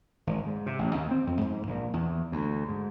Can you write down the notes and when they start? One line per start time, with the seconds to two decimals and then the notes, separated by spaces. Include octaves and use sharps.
0.27 G#1
0.47 G#2
0.66 C3
0.79 A1
0.95 D#2
1.11 C4
1.27 F2
1.41 G#2
1.67 A#1
1.93 E2
2.32 D2
2.69 G#2